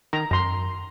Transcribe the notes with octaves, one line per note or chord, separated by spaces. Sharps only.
D#3 A#5
F#2 A#5 C6